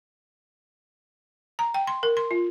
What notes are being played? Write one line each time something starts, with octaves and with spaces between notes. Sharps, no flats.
A#5
G5
C6
A#4
C6
F4